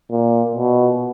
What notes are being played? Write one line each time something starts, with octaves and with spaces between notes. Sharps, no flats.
A#2
B2